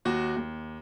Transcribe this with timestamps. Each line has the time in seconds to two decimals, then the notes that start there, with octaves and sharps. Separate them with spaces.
0.05 D#2 F#4
0.36 D#2